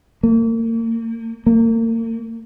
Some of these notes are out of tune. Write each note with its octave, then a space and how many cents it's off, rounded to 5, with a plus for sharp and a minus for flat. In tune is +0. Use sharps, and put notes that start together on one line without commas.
A#3 -35
A#3 -40